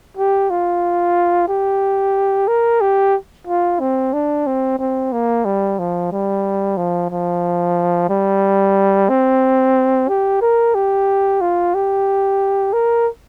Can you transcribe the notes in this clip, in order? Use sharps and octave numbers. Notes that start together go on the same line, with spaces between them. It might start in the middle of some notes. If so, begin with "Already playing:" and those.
G4
F4
G4
A#4
G4
F4
C4
D4
C4
C4
A#3
G3
F3
G3
F3
F3
G3
C4
G4
A#4
G4
F4
G4
A#4